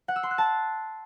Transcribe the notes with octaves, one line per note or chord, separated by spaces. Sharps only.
F#5
E6
C6
F#6
A5